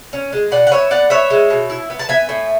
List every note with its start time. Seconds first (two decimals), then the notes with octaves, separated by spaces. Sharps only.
0.13 C#4
0.33 G#3
0.51 B2 D5 F#5
0.67 F#5
0.71 B3 C#5 E5
0.90 B3 D5 F#5
1.10 B3 C#5 E5
1.30 G#3
1.50 B2
1.70 E4
1.90 B3
1.99 A5
2.09 B3 E5 G#5
2.29 A2